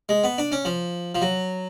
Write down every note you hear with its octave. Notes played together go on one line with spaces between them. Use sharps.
G#3
B3
D4
C#4
F3
F3
F#3